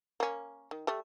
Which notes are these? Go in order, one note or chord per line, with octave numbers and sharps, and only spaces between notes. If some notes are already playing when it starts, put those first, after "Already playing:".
A#3 C#4
D#3
G3 A3